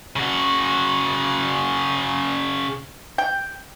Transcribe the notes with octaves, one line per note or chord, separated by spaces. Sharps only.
C#3 F#4
G5